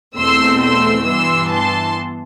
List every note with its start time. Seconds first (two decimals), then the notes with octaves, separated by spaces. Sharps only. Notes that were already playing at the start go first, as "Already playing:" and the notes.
0.17 E2 B2 A3 C4 C6 E6
0.62 C6 E6
1.06 G2 E3 B3 C6 E6
1.51 A5 C6